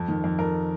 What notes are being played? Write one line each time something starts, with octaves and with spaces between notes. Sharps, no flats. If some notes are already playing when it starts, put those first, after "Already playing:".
Already playing: F2
D#3
F2
F2 A#4